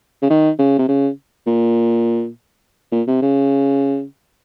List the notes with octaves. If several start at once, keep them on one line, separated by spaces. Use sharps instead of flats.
C#3
D#3
C#3
C3
C#3
A#2
A#2
C3
C#3